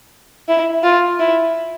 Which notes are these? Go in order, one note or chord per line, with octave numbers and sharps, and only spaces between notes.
E4
F4
E4